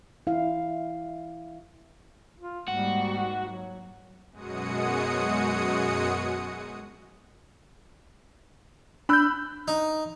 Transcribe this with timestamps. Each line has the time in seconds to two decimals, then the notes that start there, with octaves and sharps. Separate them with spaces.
0.27 E4 F5
2.39 F4
2.68 G#2 G3 A#3 F#4
3.44 F#3
4.31 F#2 B2 G#3 F#4 D#6 C#7
9.09 D4 B5 E6 F#6 G6
9.68 D#4